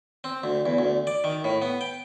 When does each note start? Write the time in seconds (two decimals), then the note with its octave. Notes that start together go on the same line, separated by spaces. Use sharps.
0.24 C4
0.44 D2
0.66 E2
0.78 D2
1.07 D5
1.24 D#3
1.44 A2
1.62 B3
1.81 G5